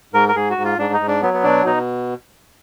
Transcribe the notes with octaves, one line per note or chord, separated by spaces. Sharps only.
G#2 A#4
A#4
G#2 G#4
F#4
G#2
F4
G#2 D4
D#4
G#2
D4
F#3 B3
B3
B2 D4
B2 D#4